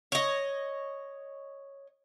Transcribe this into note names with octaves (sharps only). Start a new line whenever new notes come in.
C#5 D#5